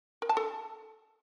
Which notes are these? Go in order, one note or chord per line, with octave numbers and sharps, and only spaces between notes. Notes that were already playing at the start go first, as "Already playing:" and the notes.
A#4
A5
A4